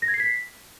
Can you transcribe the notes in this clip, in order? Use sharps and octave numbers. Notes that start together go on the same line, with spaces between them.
A#6
G#6
C7
B6